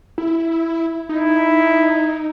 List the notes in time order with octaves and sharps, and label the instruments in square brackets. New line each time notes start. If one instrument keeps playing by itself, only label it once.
[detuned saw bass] E4
[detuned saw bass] D#4 [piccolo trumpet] E4